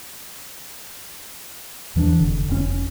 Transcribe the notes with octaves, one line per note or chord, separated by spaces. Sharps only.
E2 E3 G3 D4
F1 D3
F1 A#2 C#4